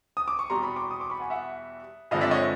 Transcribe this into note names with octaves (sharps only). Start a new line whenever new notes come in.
D#6
D6
C#6
E2 B2 G3 A#5 C6
B5 C#6
C6 D6
C#6 D#6
C6 D6
B5 C#6
F#5 G#5
E5 F#5
G2 D3 F3 G#3 C4 D#5 F5
D5 E5
C#5 D#5